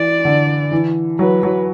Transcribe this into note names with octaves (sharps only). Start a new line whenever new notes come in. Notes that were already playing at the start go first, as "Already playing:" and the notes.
Already playing: E3 D5
D3
E3
F#3 B4
F#3